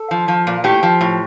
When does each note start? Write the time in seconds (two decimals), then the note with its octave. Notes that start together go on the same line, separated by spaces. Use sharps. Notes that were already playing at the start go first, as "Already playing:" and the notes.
Already playing: A4
0.11 F3
0.28 F3
0.47 A#2
0.64 A2 G4
0.83 F3
1.01 A2